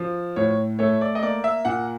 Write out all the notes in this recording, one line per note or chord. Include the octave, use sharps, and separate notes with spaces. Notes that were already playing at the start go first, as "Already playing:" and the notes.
Already playing: F3
A2 C#5
A3 C#5
D5
D#5
A#3 D5
E5
A#2 F#5